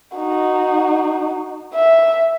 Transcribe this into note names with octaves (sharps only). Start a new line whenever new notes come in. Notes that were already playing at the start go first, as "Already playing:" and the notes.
D#4 F#4
E5